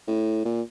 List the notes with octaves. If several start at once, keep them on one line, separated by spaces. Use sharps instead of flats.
A2
A#2